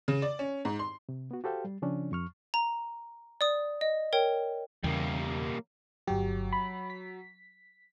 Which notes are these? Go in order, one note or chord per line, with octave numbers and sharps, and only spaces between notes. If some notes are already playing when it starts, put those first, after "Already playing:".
C#3
D5
C#4
G#2
C6
C3
B3 F#4
F#4 G4 A4 C5 F5 G5
G3
C#3 F3 C#4 D4
F2 C#6 F6
A#5
D5 D#6
D#5
A#4 C#5 G5
E2 C#3 G3 A#3
G1 F#3 G4
B5
B6